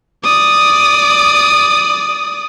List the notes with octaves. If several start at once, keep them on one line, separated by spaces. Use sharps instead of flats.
D5 D#6